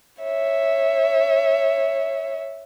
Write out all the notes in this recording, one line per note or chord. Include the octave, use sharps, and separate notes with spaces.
C#5 E5